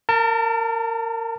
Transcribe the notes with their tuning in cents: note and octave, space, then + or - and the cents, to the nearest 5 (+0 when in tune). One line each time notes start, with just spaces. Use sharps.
A#4 -20 A5 +30